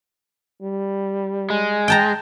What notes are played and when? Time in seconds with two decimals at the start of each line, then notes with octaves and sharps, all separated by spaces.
0.62 G3
1.50 G#3
1.88 G5 A5 A#5